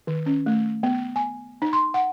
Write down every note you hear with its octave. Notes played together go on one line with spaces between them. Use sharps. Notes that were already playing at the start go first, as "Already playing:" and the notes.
D#3
C#4
A3
B3
G#5
D#4
C6
F#5